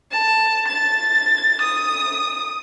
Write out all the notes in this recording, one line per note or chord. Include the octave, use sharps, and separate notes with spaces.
A5
A6
D#6